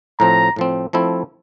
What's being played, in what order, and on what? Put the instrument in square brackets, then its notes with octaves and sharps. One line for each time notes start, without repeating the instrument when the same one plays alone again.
[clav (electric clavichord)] A2 F3 C4 [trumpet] A#5
[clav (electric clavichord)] A2 F3 C4
F3 A3 C4 E4